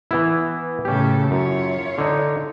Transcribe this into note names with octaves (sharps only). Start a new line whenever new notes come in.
E3 B3 E4
A2 C#3 C#4 G4 A4
F#2 E4 F4 C#5
D3 D#4